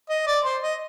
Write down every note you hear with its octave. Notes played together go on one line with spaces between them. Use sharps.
D#5
D5
C5
D#5